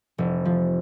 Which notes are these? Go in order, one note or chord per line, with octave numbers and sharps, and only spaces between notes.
F1
F3